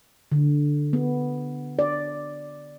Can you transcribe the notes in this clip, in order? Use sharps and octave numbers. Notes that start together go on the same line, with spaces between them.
D3
B3
D5